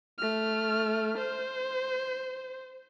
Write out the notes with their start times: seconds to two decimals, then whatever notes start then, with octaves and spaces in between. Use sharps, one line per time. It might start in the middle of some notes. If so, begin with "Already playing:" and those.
0.18 A3 F6
1.18 C5